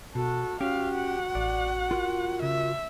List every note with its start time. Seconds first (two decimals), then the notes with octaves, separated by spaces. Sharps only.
0.15 B2 F#4 A4
0.61 C#4 F#4 G4 F5
0.95 F#5
1.35 A1 D5
1.91 F4 A#4 F#6
2.42 C#3 E5